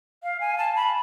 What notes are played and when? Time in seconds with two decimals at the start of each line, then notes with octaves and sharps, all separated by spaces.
0.23 F5
0.41 G#5
0.58 A5
0.76 B5